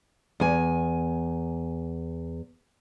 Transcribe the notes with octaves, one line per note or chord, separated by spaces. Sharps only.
E2 G#5